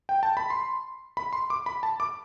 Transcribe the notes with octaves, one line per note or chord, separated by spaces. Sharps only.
G5
A5
B5
C6
B5
C6
D6
B5
A5
D6